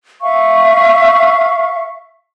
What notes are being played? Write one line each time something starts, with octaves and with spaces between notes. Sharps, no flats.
E5 F5 C#6